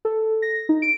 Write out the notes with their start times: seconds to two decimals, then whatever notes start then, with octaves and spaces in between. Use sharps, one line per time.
0.05 A4
0.42 A#6
0.69 D#4
0.82 D7